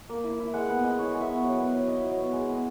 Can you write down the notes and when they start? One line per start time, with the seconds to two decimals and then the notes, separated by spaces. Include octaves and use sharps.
0.09 A#3
0.24 E4
0.39 E4
0.54 G#3 F#5
0.69 B3
0.84 G#3 D#5
0.99 E4 C#5
1.14 G#3
1.21 E5
1.29 B3
1.43 F#3
1.59 B3
1.73 F#3
1.88 E4 D#5
2.04 F#3
2.18 B3
2.33 G#3
2.48 B3